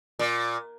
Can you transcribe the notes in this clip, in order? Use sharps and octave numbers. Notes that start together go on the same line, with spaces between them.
A#2